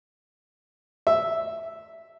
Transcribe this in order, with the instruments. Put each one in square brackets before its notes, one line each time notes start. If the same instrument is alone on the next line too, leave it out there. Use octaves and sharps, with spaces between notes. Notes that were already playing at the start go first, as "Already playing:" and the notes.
[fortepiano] E5